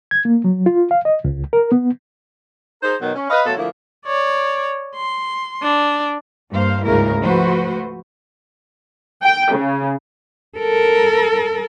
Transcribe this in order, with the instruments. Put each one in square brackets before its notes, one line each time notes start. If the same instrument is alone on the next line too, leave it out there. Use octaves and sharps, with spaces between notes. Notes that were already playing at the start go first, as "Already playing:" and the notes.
[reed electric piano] G#6
A#3
F#3
F4
F5
D#5
C#2
A#4
B3
[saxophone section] D#4 G#4 A#4 C5
B2 D#3 F#3
C#4
B4 D#5 F5
B2 F#3 A3 F4 F#4 A4
D3 F3 A3 A#3 E4
[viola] C#5 D5
C6
D4
[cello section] G2 A#3 C5 F5
D2 G#2 C#3 A#3 E4 A#4
F3 A3 F#4 B4 C5
[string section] G5
C#3
[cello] A4 A#4